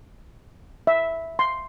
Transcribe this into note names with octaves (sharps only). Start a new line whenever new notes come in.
E5
C6